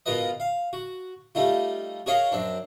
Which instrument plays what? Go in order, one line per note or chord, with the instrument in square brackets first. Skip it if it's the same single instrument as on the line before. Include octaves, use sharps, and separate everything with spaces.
[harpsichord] G#2 B2 F4 A#4 B4 D#5
F5
F#4
G3 A3 D#4 F4
F#4 G#4 A#4 C#5 D#5 F5
F#2 C4 D4